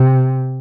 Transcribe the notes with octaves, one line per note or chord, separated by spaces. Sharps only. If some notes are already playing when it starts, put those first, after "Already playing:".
Already playing: C3